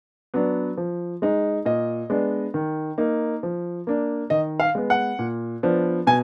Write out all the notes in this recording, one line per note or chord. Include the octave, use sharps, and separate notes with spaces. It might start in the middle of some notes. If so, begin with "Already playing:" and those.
F#3 B3 D4
F3
G#3 D#4
A#2 D#5
G#3 B3 D4
D#3
A#3 D#4
F3
A#3 D4
D#3 D#5
F5
G#3 B3
F#5
A#2
F3 B3 D4
B2 G#5